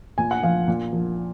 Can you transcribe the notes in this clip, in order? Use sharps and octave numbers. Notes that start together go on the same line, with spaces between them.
A#2 G#5
F#5
F3 F5
A#2
F3